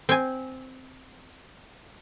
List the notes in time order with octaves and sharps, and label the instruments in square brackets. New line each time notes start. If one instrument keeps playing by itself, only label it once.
[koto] C4 G#5